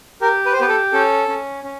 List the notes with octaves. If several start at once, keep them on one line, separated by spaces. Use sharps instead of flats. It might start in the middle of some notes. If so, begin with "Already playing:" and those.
G4 A#4
B4
C5
B3 G4 B4
A4
C#4 A4
C#4
C#4